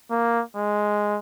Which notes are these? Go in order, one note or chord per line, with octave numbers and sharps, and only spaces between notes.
A#3
G#3